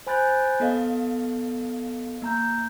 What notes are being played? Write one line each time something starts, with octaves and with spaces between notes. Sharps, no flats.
C5 G#5 B5 F#6 G6 A6
B3 A4 D#5 F5
A#3 A#5 G6